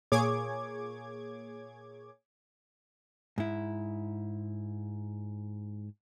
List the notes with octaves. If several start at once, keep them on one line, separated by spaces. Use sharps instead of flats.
A#2 A#3 G#4 C#5 D6 G#6
G#2 E4